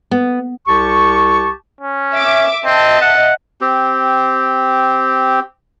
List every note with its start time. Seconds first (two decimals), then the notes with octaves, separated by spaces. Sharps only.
0.11 B3
0.68 C2 G4 A5 C#6
1.81 C#4
2.14 E5 D6
2.65 C4 D#5 E5 A5
3.01 F#5
3.61 C4 G4